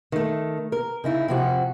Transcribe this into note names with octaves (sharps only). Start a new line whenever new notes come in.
D#3 A3
A#4
C#3 D#4 E4
C3 F3 F#4